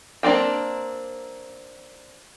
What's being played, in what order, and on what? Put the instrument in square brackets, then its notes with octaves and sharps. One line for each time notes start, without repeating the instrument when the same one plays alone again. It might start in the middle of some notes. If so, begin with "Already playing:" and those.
[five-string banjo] A#3 C4 D4 F4 G5